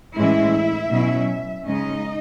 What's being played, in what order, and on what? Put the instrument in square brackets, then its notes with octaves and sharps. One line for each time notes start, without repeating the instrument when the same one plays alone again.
[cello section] A2 E3 G#3 C#4 E4 E5
B2 F#3 C#4 E4
C#3 G#3 C#4 D#4 D#5